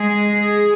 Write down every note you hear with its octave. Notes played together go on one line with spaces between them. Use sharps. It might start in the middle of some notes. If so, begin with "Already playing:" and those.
Already playing: G#3 G#4